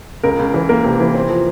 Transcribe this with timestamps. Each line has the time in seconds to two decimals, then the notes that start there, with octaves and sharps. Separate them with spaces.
0.24 C#2 A#4
0.39 C#2
0.54 E3
0.69 A#3 A#4
0.85 C3
1.00 E3
1.14 C4
1.30 F3